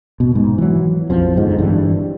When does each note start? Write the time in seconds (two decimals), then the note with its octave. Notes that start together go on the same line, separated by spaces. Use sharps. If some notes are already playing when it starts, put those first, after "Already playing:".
0.20 B2
0.35 G#2
0.58 E3 F#3
1.10 A#1 F2 F3
1.36 G1 F2 G#2
1.59 G2 E3 G3